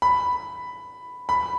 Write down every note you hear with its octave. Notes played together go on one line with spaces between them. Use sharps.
B5
B5